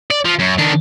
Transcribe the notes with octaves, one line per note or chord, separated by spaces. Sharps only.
D5
F3
F#2
D#3 D4